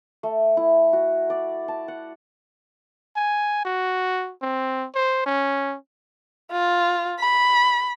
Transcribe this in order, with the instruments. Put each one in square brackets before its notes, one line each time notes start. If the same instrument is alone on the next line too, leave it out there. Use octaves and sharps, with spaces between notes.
[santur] A3
E4
F#4
D5
A5
F#5
[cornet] G#5
F#4
C4
C5
C#4
[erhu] F4
B5